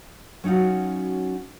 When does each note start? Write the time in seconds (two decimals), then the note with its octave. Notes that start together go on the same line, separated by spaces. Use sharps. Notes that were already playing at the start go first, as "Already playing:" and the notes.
0.44 F#3 C#4 D#4 F4 F#4